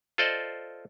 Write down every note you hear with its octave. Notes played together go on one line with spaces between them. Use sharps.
F4 A4 C5 D5 D#5